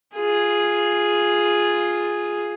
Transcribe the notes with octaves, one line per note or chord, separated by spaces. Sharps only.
F4 G#4